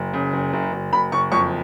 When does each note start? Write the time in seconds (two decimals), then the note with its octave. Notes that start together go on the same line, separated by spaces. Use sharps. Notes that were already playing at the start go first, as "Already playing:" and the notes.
Already playing: F#1
0.13 C#3
0.33 F#1
0.53 F#1
0.73 F#1
0.92 F#1 B5
1.12 F#1 C#6
1.32 F2 C#6